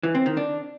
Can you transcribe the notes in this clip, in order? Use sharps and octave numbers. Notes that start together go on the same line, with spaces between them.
E3
C4
D#3
D4